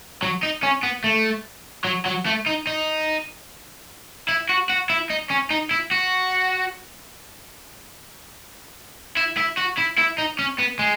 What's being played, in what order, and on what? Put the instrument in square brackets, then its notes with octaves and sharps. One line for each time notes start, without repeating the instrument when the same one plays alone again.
[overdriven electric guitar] F#3
D#4
C#4
B3
A3
F#3
F#3
A3
D#4
D#4
E4
F#4
F#4
E4
D#4
C#4
D#4
E4
F#4
E4
E4
F#4
E4
E4
D#4
C#4
B3
G#3